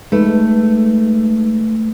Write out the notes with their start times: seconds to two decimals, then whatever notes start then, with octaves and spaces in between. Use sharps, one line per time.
0.12 G#3 A3 D#4 B4